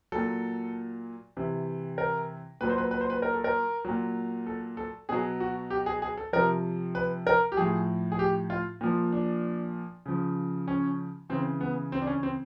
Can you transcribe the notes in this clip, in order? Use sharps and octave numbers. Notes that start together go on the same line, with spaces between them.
A#2 F#3 A4
C3 E3
A#4
A#2 F#3 B4
C5
B4
B4
C5
B4
A#4
A4
A#4
A#2 F#3
A4
A4
B2 F#3 G#4
F#4
G4
G#4
G#4
A4
C3 F3 A#4
B4
A#4
G4
A2 F3 G#4
G#4
G4
F4
A#2 F3
D4
C#3 F3
C#4
C#3 E3 C4
B3
C4
D4
C#4
C4